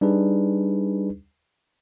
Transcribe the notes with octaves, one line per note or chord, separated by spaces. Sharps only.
G3 D4 D#4 G#4 B4